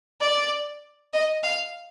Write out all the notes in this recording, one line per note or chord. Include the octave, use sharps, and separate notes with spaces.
D5
D#5
F5